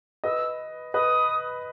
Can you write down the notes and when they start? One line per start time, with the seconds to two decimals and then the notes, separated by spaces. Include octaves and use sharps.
0.24 B4 D#5 E6
0.94 B4 D#5 D#6